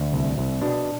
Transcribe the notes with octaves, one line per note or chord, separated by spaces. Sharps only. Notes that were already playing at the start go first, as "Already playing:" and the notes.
Already playing: D2
C2
C2
B2 D4